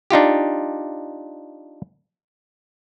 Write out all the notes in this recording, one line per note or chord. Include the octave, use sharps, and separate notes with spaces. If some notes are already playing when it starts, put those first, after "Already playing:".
D4 D#4 F4 G4